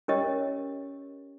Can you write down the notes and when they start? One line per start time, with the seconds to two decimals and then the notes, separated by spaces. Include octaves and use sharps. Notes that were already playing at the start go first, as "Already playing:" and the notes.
0.08 C#4 G4 A#4 C#5 D#5